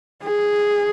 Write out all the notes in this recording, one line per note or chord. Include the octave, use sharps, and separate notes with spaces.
G#4